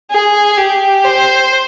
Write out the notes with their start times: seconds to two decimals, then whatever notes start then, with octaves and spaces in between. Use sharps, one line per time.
0.11 G#4
0.57 G4
1.05 C5